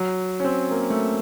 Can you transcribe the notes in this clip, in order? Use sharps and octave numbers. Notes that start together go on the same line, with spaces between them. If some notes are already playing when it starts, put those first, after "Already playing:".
Already playing: F#3
C#4
C4
A#3
A3